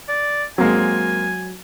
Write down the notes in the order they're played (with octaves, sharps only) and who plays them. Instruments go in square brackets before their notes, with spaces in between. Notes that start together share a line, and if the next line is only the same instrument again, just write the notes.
[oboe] D5
[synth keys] F#3 [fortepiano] G#3 A#3 C4 [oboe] G#5